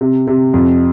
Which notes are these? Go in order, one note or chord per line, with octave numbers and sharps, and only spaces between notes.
C3
C3
F2